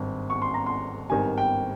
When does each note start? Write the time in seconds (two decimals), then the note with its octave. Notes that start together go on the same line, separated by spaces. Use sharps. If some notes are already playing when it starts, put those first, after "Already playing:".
Already playing: G#1 G2
0.30 C#6
0.42 C6
0.54 A#5
0.66 C6
1.10 G#1 G2 D#3 G3 G#5
1.38 G5